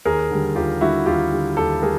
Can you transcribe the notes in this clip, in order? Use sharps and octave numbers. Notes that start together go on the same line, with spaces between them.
D#2 G#4 A#4
D3 G3
D#2 F4 G4
D3 G3 E4 F#4
D#2 F4 G4
D3 G3
D#2 G4 A4
G3 G#4 A#4